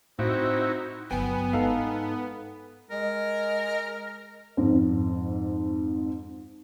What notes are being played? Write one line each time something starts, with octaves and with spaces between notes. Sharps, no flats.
A2 C4 D#4 E4 F#4
G1 F#3 B3 G5 G#5
G#2 D#4 A4 F5
G#3 A#4
F2 G#2